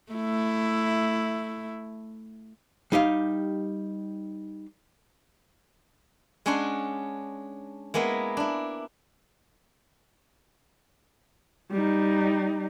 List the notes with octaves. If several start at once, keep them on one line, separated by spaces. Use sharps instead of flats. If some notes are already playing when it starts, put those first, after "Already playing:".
A3 E4
G3 D#4 G4 F5
G#3 C#4 D4 C#5 F#5 C6
G#3 A#3 B3 E4 A#4
D4 E4
G3 D#4